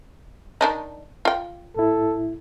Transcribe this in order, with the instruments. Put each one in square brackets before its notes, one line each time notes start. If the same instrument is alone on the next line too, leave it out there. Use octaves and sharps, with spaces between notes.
[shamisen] D#3 D4 D#4
F4 G5
[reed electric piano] A2 E4 [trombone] A4